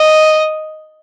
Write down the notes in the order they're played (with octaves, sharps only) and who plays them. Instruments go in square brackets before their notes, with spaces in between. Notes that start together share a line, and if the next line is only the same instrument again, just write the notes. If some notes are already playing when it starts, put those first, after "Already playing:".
Already playing: [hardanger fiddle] D#5